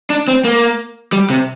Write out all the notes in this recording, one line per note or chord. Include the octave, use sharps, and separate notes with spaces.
D4
C4
A#3
G3
C3